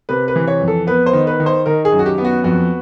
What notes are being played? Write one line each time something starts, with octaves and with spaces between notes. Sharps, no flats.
C3 B4
B4
E3
C#5
F2
A4
B3 B4
C5
D#3
B4
D#3
C5
D#3 A#4
G#4
F#2
F#4
G4
B3
F#4
F2 F#4